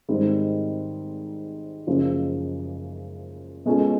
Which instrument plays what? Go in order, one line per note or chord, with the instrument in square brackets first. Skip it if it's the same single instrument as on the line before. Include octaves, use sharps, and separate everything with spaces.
[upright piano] G#1 G#2 D#3 G3 C4
F#1 F#2 C#3 F3
B2 G#3 C#4 F4 A4